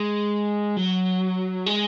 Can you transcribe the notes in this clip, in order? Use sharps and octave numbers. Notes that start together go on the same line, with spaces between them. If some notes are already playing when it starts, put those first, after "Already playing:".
Already playing: G#3
F#3
G#3